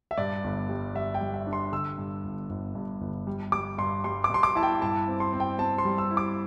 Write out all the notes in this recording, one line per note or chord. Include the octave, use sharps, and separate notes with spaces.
E5
G2 D5
G1
G3
G3 E5
G5
G3
E5
D4
C6
D3 E6
G2
G1
G1
G2
G1
G3
G3 D6
G2 C6
G3 C6
D6
G2 C6
D6
E4 A5
G5
G2 A5
C4
C6
C4
G5
C4 A5
C6
G3
E6
E4
D6